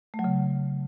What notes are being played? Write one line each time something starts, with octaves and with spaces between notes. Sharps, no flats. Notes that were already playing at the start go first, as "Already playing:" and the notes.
A3
F#3
C#3